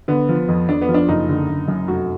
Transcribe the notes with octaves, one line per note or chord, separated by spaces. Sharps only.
D3 B3
F3
F2
F2 D4
B3
F3
D4
F#1 D#4
D3
F#1
F#2
F1 F#4